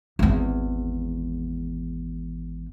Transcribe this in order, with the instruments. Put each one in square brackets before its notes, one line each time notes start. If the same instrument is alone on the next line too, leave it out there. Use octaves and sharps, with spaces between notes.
[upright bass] G#1 E2